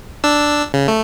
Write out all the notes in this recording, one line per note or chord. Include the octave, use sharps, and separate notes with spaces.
D4 E6
C#3
A3